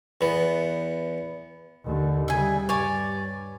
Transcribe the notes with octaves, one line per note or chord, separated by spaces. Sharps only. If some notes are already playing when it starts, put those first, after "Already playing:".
E2 B3
D#2 D3
C#3 G3 E5 G#5
G2 C#5 D5 G#5